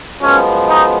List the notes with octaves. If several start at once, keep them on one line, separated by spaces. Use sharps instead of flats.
F#2 F3 G#3 B3 C#4
D#4